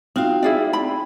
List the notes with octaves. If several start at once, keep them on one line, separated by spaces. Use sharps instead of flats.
C4 D#4 F4 F#4 F5
E4 G#4 D5
D5 G5 B5